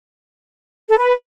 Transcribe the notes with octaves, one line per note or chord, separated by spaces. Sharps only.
A4
B4